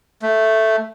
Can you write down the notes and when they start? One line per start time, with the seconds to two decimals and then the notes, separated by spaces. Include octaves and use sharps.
0.22 A3